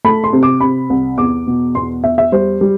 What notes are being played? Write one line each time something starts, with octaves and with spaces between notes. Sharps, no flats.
A3 B5
C6
C3
D6
C3 B5
C2
E2 D6
B2
E2 C6
E2 E5
E5
G3 C5
G3